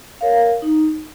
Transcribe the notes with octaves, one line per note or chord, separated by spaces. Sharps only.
A#4 C#5 F5
D#4